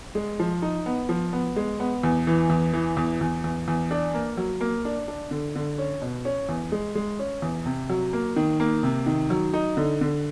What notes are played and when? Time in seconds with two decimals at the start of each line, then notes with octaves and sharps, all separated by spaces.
0.15 G#3
0.40 F3
0.62 D#4
0.86 B3
1.09 F3
1.33 B3
1.56 G#3
1.80 B3
2.03 E2
2.27 E3
2.50 E2
2.73 E3
2.97 E2
3.21 E2
3.44 E2
3.68 E2
3.91 D4
4.14 A#3
4.37 F#3
4.61 A#3
4.85 D4
5.08 D4
5.31 D3
5.55 D3
5.78 C#4
6.02 B2
6.25 C#4
6.49 E2
6.72 G#3
6.95 G#3
7.19 C#4
7.42 E2
7.66 C3
7.90 F#3
8.13 A#3
8.36 D#3
8.60 A#3
8.83 C3
9.06 D#3
9.30 F#3
9.54 D#4
9.77 D3
10.01 D3